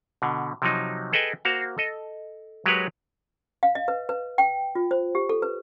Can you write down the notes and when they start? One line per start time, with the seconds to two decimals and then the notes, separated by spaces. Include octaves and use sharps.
0.22 B2 D3
0.62 C3 F3 F#3 D#4
1.13 G#4 A4 B4 D#5 G5 G#5
1.45 A#3 F#4 C5 F5
1.78 A4 D#5
2.66 F#3 G#3 G4 A#4 B4 C#5
3.63 F5
3.75 D#5
3.88 B4
4.09 B4
4.38 G5
4.75 F4
4.91 C5
5.15 G4
5.29 A4
5.42 B4